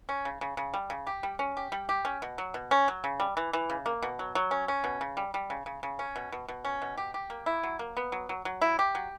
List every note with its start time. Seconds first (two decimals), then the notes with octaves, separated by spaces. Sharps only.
0.09 C#4
0.25 C#3
0.41 C#3
0.57 C#3
0.74 G3
0.90 C#3
1.07 G4
1.23 G3
1.39 C#4
1.57 G4
1.72 G3
1.89 G4
2.05 C#4
2.22 B2
2.38 F#3
2.54 B2
2.71 C#4
2.88 F#3
3.04 C#3
3.20 G3
3.37 E3
3.53 E3
3.70 C#3
3.86 A#3
4.02 B2
4.19 F#3
4.35 F#3
4.51 C#4
4.68 C#4
4.84 B2
5.01 C#3
5.17 G3
5.34 G3
5.50 C#3
5.66 C#3
5.83 C#3
5.99 C#4
6.16 B2
6.32 B2
6.48 B2
6.65 C#4
6.82 B2
6.97 G4
7.14 G4
7.30 A#3
7.46 E4
7.63 F#3
7.79 A#3
7.97 B3
8.12 F#3
8.29 F#3
8.45 F#3
8.62 E4
8.79 G4
8.95 F#3